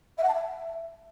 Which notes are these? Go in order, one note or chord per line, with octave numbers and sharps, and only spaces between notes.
E5
F#5
A5
E5